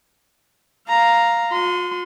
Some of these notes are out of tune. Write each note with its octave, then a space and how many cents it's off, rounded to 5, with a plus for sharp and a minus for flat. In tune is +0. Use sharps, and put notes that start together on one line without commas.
F5 +0 A#5 +0
F4 +45 C6 -25